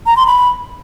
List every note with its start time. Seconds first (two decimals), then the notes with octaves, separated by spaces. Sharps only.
0.06 A#5
0.17 C6
0.27 B5